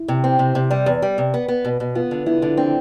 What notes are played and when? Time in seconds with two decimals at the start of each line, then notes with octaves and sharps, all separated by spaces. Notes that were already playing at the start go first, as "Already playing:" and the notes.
Already playing: E4
0.08 C3
0.24 C4
0.39 C3
0.55 C3
0.71 G3
0.86 E2
1.02 G3
1.18 C3
1.34 B3
1.48 B3
1.65 B2
1.80 B2
1.95 B3 F4
2.11 D3
2.26 B3 E4
2.42 D3
2.57 C4 D4